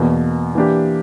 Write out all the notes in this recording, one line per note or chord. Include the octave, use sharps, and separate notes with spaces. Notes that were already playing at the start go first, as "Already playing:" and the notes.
Already playing: E2 B2 A#3
E3 A#3 D4 G4